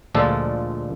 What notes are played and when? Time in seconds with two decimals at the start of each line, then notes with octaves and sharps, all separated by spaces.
0.15 D2 A#2 F3 G#3 D4 A4